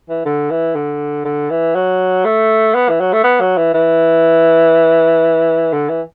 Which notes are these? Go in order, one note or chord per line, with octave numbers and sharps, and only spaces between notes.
E3
D3
E3
D3
D3
E3
F#3
A3
B3
E3
F#3
A3
B3
F#3
E3
E3
D3
E3